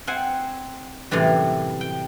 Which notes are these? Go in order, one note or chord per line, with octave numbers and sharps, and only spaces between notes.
C4 C5 F#5 G#5
F#2 A2 C3 E3 G3
G5